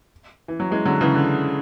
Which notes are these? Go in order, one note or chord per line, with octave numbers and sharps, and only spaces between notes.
E3
F#3
E3 G#3
D3 F#3
C#3 E3
D3